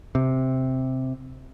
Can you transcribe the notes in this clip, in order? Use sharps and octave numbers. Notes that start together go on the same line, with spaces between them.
C3